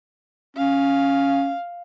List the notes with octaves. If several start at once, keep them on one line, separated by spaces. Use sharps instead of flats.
C#4 F5